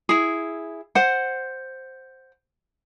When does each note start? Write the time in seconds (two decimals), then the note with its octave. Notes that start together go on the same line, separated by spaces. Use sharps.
0.09 E4 G#4
0.95 C5 F#5